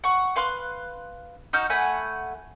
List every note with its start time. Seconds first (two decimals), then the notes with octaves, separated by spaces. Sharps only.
0.04 F#5 C#6
0.36 B4 F5 C6 F#6
1.53 D#4 F#4 F6 G6
1.70 A3 F#5 G#5 B5